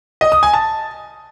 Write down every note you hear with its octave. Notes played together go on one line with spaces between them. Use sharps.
D#5
D#6
G#5
A5